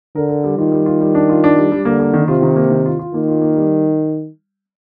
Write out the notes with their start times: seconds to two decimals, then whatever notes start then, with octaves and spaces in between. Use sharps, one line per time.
0.15 D3 A#4
0.29 A#4
0.44 G3
0.58 D#3 F4
0.72 G3
0.86 F4
1.00 G3
1.15 D4
1.29 F4
1.44 D4
1.57 G3
1.71 G3
1.85 D3 A#3
2.00 A#3
2.13 D#3
2.28 C3 F4
2.42 D#3
2.56 A#3
2.71 D#3
2.86 F4
2.99 F4
3.14 D#3 A#3
3.28 F4
3.41 A#3
3.56 G3